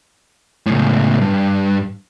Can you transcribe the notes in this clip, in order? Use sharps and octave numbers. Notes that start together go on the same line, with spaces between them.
C#2 A2
G2